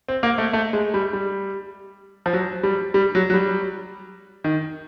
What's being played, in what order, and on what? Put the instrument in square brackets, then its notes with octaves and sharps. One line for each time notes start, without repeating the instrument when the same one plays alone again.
[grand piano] C4
A#3
A3
A3
G#3
G3
G3
F3
F#3
G3
G3
F#3
F#3
G3
D#3